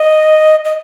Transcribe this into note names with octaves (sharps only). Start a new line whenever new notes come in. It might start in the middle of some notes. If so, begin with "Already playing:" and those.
Already playing: D#5
D#5